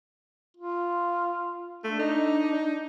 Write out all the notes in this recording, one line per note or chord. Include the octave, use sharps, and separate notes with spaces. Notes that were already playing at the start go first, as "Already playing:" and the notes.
F4
A3 D4
D#4